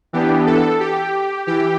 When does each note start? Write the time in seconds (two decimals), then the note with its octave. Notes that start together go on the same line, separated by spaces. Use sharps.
0.13 E3 B3 D4 G4
0.46 A4
0.80 G4
1.47 E3 G4